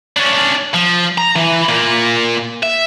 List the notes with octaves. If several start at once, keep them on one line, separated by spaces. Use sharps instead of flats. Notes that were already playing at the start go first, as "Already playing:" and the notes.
C#4 D4
F3
A#5
E3
A#2 A#3
E5